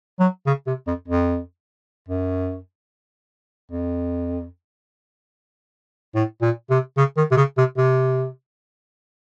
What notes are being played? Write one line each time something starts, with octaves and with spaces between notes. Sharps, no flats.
F#3
C#3
C3
F2
F2
F#2
F2
A2
A#2
C3
C#3
D#3
C3
C#3
C3
C3